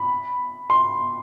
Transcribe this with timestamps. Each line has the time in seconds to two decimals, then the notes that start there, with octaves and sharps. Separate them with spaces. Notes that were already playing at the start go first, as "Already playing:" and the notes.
Already playing: B5
0.70 C6